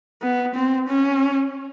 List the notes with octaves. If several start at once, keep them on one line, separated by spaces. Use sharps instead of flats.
B3
C4
C#4